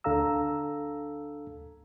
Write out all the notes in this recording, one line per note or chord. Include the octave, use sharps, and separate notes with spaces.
D2 D4 A4 F5 A#5 E6